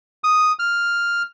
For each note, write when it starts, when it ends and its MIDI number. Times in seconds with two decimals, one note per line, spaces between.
0.24 0.52 87
0.59 1.23 89